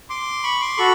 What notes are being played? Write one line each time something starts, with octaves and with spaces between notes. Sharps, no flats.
C6 D6
B5 C#6
C6 D6
F#4 A4 B5 C#6